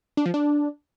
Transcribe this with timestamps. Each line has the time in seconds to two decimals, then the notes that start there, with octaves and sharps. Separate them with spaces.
0.17 D4
0.26 F3
0.34 D4